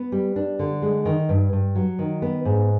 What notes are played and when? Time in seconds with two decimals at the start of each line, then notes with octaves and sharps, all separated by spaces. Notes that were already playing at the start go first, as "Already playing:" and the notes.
Already playing: B3
0.12 G3
0.36 D4
0.59 D3
0.82 G#3
1.05 D#3
1.29 G2
1.53 G2
1.75 F#3
1.99 D#3
2.22 B3
2.45 G#2